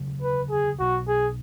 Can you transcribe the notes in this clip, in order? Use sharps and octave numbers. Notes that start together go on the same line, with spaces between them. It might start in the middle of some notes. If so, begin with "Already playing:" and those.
Already playing: E1 D2 C#3 F#3
B4
G#4
B1 B2 F#3 F#4
G#4